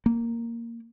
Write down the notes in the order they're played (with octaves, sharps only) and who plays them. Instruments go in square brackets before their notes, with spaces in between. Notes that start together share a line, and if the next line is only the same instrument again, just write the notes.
[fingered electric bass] A#3